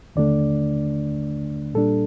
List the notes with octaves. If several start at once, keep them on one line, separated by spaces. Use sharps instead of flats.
D#2 D3 A3 D4 D5
A#2 G3 D4 A4